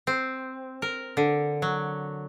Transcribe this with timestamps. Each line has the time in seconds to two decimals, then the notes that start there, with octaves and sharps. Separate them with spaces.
0.07 C4
0.82 A#4
1.17 D3
1.62 F#3